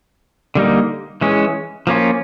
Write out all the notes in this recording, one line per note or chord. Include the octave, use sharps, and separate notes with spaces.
D3 G3 A#3 D#4
E3 G#3 C#4
F3 A#3 C#4 F4